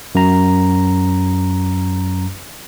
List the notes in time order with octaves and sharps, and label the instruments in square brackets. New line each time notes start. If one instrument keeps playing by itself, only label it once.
[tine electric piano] F#2 A#5